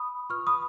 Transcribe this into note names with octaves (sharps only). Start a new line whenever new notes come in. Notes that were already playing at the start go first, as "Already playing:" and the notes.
Already playing: B5 D#6
F4 B4 C#6 F6
B5 D#6